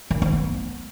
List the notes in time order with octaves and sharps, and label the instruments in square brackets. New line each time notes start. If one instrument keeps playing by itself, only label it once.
[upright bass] D#3
C4
B3